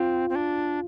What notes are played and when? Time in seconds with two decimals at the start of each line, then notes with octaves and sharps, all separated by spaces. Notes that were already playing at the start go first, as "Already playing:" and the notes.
Already playing: C4 F4
0.29 C4
0.35 D4